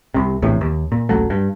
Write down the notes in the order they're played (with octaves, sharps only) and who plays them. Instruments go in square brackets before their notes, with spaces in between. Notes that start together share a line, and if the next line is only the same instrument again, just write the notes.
[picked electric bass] C2 C3
A#1 E2 A2 C3
D#2
A#2
D#1 A#1 F#3 A3
G2